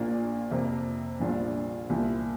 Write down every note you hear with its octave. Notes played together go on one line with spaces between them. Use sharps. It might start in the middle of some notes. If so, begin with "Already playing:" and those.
Already playing: A#1 A#2 A#3 D4 F4
F2 C3 A#3
A#1 A#2 G3 D4 F4
C2 A#2 F3 A#3 F4